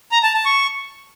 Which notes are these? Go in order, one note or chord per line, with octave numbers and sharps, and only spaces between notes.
A#5
A5
A5
C#6